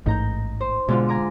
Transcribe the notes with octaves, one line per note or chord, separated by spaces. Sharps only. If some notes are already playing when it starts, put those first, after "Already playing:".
A1 G#2 D#4 A#5 G6
C5
G#2 B2 D3 F4
G#5 A#5 D6